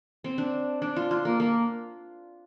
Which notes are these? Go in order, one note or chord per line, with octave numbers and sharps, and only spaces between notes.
C4
D4
D4
F4
F4
A#3
A#3